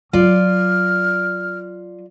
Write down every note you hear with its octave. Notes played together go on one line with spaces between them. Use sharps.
F#3 F4 D5 F6